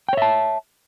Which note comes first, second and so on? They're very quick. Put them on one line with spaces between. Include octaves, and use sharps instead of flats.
G5 C#5 E5 A5